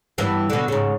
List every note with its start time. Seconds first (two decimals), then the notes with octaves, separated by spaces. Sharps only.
0.18 G2 E3 B3
0.50 B2 D3
0.68 G#2 C#3